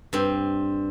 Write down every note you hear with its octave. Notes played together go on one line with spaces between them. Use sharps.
G2 C4